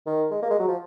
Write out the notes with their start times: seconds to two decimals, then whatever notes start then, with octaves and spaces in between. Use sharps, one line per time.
0.06 D#3
0.31 G#3
0.42 A#3
0.51 G#3
0.59 F#3
0.68 F3